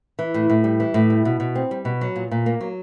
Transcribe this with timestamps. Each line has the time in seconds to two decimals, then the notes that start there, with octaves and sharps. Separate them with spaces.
0.19 E3
0.34 A2
0.50 A2
0.64 G3
0.80 E3
0.94 A2
1.10 G3
1.25 B2
1.40 B2
1.55 C4
1.71 G3
1.85 B2
2.01 F#3
2.16 A#2
2.31 A#2
2.46 A#3
2.61 F#3